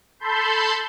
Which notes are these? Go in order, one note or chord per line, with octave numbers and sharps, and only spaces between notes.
A4 A5 B5 C6 G6